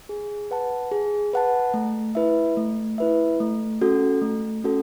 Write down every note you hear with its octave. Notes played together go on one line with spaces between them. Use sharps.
G#4
B4 F#5 A5
G#4
B4 F#5 A5
A3
E4 B4 E5
A3
E4 B4 E5
A3
C#4 F#4 A4
A3
C#4 F#4 A4